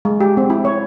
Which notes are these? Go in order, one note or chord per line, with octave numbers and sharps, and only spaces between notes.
G#3
G4
C4
E4
C#5